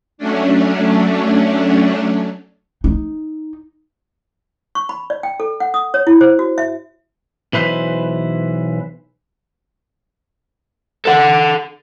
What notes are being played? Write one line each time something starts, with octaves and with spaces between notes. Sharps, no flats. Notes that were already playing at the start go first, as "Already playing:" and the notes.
F#3 A3 C#4 D4
D#4
C#6
B5
D5
G5
A4
F#5
D#6
C#5
E4
C5
F#4
E5
B1 E3 B4 C5
A4 F#5